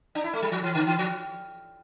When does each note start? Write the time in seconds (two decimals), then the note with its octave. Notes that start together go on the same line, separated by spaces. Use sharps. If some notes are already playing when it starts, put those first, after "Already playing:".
0.15 D4
0.24 E4
0.33 A3
0.42 G3
0.52 F3
0.63 E3
0.75 D3
0.87 E3
0.99 F3